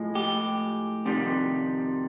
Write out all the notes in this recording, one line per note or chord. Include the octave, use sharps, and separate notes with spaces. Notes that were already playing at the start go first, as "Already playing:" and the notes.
Already playing: A2 F3 G#3
G4
F2 C3 D#3 G3